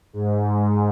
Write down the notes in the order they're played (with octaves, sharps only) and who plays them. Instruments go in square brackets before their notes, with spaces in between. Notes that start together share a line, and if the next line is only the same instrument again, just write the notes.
[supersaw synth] G#2